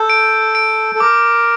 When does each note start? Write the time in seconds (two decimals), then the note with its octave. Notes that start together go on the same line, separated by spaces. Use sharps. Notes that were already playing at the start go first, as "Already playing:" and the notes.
Already playing: A4 G6
0.10 D7
0.55 D7
0.95 A4
1.00 A#4 D6